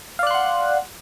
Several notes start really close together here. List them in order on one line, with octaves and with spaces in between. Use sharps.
F5 D5 F#6 C6 F#5